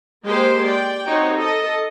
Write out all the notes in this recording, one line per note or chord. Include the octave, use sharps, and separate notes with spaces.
G#3 A#3 G4 C5 G5 C6
D5 G5
C4 D#4 F#4 C#5
A4 D#5